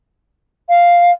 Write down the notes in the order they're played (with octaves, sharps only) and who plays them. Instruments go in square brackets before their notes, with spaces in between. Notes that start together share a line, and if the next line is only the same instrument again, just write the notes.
[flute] F5